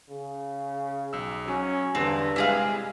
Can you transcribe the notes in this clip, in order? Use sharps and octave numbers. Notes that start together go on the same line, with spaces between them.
C#3
B1 E6
F#3 C#4
E2 G2 D3 C4
C3 G3 G#3 E4 G#4 F5